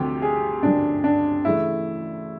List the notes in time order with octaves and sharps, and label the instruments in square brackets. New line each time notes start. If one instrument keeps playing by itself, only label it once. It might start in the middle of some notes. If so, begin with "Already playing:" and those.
Already playing: [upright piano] D2 C3 F3 [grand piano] G4
[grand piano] G#4
[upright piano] D2 C3 F3 [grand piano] D4
[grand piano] D4
[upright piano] C#3 E3 A3 [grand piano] E4